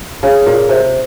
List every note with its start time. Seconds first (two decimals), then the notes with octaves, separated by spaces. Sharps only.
0.23 C#3
0.46 A#2
0.69 C3